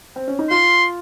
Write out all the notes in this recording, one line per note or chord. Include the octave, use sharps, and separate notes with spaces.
C4
C#4
D#4
F4 C6